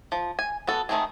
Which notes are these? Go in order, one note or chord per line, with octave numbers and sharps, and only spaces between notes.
F3
G#5
B3 F#4 A4
D#3 F#3 A3 C4 G#4